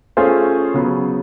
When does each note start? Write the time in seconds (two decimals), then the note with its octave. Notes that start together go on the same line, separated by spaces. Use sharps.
0.17 A3 C#4 F4 G#4 C5
0.74 C#3 F#3 B3